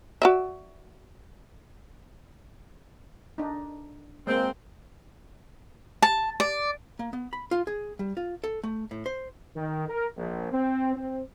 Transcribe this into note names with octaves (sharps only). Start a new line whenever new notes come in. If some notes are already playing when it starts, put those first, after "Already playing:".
F#4 D5 E5
D4 D#4
G#3 A#3 C4
A5
D5
A#3
B3
B5
F4
G#4
G3
F4
A4
A3
A2
C5
D#3
A#4
A#1
C4
C4